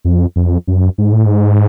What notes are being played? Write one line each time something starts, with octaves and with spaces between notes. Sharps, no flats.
F2
F2
F#2
G#2
A2
G#2